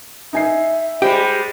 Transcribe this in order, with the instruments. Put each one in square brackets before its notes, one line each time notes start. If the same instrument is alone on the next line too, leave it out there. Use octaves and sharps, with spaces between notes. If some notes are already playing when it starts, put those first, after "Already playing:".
[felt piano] D#4 G#5 C7 [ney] E5
[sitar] G3 G#3 [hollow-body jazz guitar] G4 [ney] C5